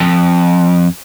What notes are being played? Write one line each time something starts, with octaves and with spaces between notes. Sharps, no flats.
F2